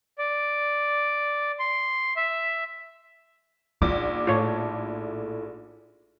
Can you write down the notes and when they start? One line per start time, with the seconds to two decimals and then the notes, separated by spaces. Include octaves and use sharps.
0.18 D5
1.59 C6
2.16 E5
3.82 A#1 D#4 D6
4.27 A2 A3 F4 C#5